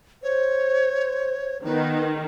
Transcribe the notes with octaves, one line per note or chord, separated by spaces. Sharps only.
C5 C#5
D#3 B3 B4